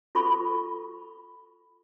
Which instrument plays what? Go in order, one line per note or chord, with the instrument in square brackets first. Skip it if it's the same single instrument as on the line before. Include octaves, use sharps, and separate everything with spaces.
[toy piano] F4 A4 B5 C#6